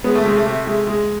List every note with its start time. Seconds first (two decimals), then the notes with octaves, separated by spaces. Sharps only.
0.04 G#3 B3
0.15 A3
0.25 C3 G#3
0.37 A3
0.46 C3
0.67 G#3
0.87 G#3